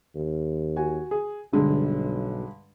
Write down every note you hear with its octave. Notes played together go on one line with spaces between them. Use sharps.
D#2
F#4 G#5
G#4
B1 G2 D3 G#3